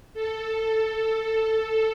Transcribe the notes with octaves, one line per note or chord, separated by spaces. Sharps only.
A4
A4